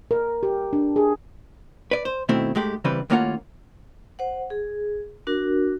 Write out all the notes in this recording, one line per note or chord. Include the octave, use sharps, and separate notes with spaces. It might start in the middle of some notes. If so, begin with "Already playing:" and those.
A#4
G4
D4
G#4
B4 D5
C5
B2 D#3 A3 C4 E4
G#2 G#3 A3 G4
C#3 E3 G3 C4 C#4 B4
D#2 A2 A#3 C#4 F4 F#5
C5 F#5
G#4
D4 F#4 A#4